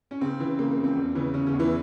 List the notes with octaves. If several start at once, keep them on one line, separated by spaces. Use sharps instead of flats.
C#4
C#3 C4
E3
C#3 A#3
A#3
F2
C4
E2
C#3 E3 C#4
C#3 C#4
C#3 C#4
E2
E3 E4